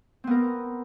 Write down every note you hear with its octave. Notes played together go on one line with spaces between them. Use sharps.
B3 C4 A#4